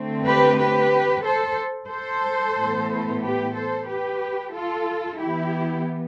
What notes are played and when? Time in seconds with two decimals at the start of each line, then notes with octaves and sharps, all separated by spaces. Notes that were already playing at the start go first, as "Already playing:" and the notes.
Already playing: D3 A3 C4
0.26 G4 B4
0.60 G4 B4
1.25 A4 C5
1.91 A4 C5
2.57 A2 E3 B3
3.23 G4 B4
3.55 A4 C5
3.88 G4 B4
4.54 F4 A4
5.20 E3 B3 E4 G4